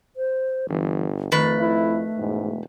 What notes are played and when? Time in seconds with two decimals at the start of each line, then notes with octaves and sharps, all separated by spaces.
0.16 C5
0.69 G1 E3
1.32 F2 D#3 A3 B4
1.60 E4
2.18 E1 G#2